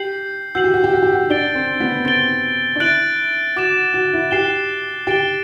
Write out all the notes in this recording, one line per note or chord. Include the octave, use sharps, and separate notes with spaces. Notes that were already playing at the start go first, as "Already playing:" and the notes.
Already playing: G4 G6 C7 F#7
F#4 E6 G6 C7 F#7
G4
F#4
G4
F#4
G4
F#4
D4 A6 D7 G7
C4
B3
C4 A6 D7 G7
D4
E4 F#6 A6 D7 F#7
F#4 D6 A6 E7
F#4
E4
G4 F#6 C7 E7 G7
G4 A6 D7 G7